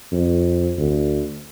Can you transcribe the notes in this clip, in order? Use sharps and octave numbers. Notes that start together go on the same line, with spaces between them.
F2
D2